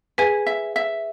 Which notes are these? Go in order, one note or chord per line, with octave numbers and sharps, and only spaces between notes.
G#4 B4 G#5
E5
E5